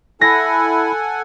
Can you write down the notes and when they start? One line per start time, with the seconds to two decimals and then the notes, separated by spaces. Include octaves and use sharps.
0.21 E4 A4 F#5 G#5 A#6